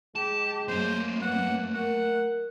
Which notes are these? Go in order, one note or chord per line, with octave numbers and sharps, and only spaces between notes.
G#3 G4 A5
F#2 A3 A#3 G#4 C5
B3 F#5
A#4 F#5